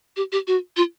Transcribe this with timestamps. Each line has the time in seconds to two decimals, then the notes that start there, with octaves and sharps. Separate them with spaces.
0.17 G4
0.32 G4
0.47 F#4
0.77 F4